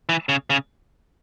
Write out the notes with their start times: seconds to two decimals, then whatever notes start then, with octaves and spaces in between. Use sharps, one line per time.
0.09 E3
0.29 C#3
0.50 C#3